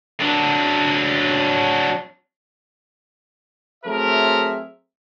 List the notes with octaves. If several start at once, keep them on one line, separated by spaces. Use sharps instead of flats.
F#3 D4
F#3 A3 C4 G#4 A#4 E5